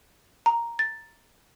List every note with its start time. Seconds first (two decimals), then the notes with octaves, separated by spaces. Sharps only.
0.46 A#5
0.79 A6